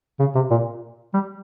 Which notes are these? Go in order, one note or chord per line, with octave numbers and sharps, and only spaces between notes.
C#3
C3
A#2
G3